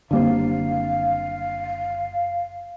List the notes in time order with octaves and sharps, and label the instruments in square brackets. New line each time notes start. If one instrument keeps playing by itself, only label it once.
[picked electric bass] F#1 A#3 [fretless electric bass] D3 G3 C4 [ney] F5